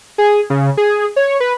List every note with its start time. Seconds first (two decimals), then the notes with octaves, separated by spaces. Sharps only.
0.18 G#4
0.50 C#3
0.77 G#4
1.16 C#5
1.40 B4